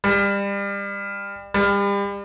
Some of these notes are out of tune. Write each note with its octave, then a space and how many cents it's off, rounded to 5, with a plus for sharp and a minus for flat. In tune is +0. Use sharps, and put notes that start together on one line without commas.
G3 +30
G3 +35